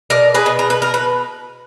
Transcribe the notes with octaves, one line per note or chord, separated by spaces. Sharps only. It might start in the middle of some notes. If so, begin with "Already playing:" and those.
B2 A#4 D5
G#4 B4
B2
A#4
B4
B2 A#4
B4